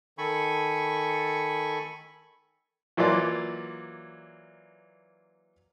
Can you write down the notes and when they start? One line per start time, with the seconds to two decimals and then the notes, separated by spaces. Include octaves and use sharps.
0.18 D#3 A4 G#5 B5 C#6
2.97 E3 F#3 A#3 F4 D5